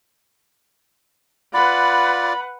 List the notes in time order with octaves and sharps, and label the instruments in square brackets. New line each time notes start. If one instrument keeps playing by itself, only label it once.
[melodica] F4 D5 [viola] B4 F#5 [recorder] B5